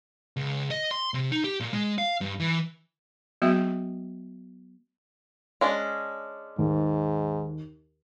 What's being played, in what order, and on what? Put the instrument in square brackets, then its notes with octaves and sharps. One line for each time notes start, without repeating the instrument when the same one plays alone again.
[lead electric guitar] C#2
D#5
C6
C3
D#4
G4
A#2
G#3
F5
G2
E3
[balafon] F#3 A#3 B3 F#4 E5
[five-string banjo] G#3 C#4 D4
[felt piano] D#2 [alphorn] G#2